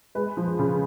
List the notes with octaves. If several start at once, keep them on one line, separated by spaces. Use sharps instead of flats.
G#3 B4
F3
C#3